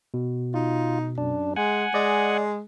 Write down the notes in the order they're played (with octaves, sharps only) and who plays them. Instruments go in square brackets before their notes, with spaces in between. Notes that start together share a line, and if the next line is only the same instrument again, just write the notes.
[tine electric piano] B2
[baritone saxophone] D#4 [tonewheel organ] F4
[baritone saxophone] F#2 [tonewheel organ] D4
[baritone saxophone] G#3 [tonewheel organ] F#5 G#5
[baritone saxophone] G#3 [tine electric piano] D5 D#5